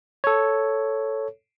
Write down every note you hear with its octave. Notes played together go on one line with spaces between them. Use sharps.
A4 C#5